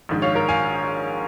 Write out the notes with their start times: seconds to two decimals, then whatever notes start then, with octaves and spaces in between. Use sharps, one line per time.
0.09 A#1 G#2 D#3
0.22 C#5 F5
0.35 A#4
0.49 F5 G#5